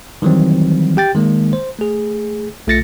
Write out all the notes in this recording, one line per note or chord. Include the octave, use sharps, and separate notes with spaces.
D#3 E3 F#3 G3 C4
G4 G5 A6
D#3 G#3 A#3
C5
A3 G#4
B1 A3 F4 A6 A#6 C#7